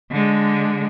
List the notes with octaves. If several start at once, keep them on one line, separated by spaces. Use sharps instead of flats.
D3 G#3